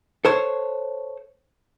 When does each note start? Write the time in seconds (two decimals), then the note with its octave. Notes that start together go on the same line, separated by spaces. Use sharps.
0.25 A4 C5 C#5